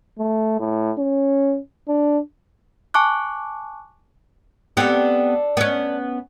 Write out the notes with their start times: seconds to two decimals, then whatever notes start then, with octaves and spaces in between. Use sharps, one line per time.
0.18 A3
0.60 A2
0.98 C#4
1.88 D4
2.94 G#5 A5 C#6 D6 F#6
4.77 B3 C4 D4 G4 A4
5.57 B3 C#4